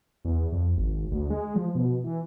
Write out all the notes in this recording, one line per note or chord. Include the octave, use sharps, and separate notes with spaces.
E2
F2
G#1
D2
G#3
F3
B2
E3